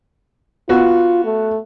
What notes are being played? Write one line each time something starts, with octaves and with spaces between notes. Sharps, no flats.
B3 F4 F#4
A3